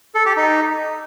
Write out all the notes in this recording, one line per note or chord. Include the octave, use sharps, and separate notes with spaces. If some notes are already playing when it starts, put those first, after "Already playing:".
A4
G4
D#4